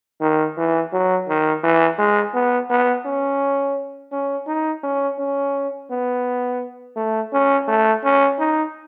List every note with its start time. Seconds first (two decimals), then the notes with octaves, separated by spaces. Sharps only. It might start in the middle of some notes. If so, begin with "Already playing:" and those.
0.21 D#3
0.58 E3
0.93 F#3
1.29 D#3
1.64 E3
1.99 G#3
2.34 B3
2.70 B3
3.06 C#4
4.12 C#4
4.47 D#4
4.84 C#4
5.19 C#4
5.91 B3
6.96 A3
7.33 C#4
7.68 A3
8.04 C#4
8.39 D#4